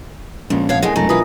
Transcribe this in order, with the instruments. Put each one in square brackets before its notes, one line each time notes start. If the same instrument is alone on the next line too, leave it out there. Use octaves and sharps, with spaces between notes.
[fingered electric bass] A#1 [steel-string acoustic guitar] F2 [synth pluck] G#3 B3 C#4
[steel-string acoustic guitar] B2 C#5 F5 [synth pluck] F#5
[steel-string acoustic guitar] D2 B2 G#3 [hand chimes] E4 A#4 G#5 [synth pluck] D#5
[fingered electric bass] C2 F#2 [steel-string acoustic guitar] A3 [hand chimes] D4 A#5 A#6
[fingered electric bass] B1 [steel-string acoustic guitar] E3 B4 [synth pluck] E4 F4 A#4 [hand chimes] G#5 D#6